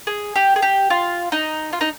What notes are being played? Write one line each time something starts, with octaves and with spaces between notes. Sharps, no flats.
G#4
G4
G#4
G4
F4
D#4
F4
D#4